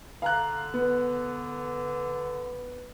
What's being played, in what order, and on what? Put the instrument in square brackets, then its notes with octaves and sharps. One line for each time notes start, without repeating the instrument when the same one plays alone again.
[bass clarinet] D3 [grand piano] F5 A#5 F#6
[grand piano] B3